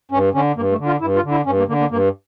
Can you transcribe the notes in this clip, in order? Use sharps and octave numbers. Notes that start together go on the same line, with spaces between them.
G2 C#4
D3 C#4
G2 A#3
A3
D3
F4
G2 E4
F4
D3
E4
G2 C#4
A#3
D3 A#3
A#3
G2 A#3